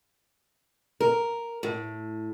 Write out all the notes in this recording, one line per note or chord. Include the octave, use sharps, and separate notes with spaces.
A#4
A2